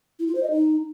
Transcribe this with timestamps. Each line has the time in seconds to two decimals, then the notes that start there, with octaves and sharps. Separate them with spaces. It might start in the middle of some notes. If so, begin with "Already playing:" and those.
0.19 E4
0.27 F4
0.35 C5
0.43 D#5
0.51 D#4